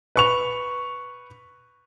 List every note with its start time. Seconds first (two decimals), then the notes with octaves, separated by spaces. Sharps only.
0.16 B4 C#6 F7